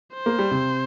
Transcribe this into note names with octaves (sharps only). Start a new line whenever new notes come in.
C5
A#3
G3
C3